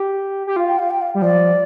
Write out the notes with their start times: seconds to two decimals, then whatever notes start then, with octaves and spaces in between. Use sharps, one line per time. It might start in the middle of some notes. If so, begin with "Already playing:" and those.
Already playing: G4
0.47 G4
0.56 F4 F5
0.68 G5
0.79 F5
0.90 G5
1.01 F5
1.15 G3
1.22 F3 D5